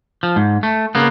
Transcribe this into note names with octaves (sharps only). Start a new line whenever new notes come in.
F3
G#2
A3
C#3 A#3 B3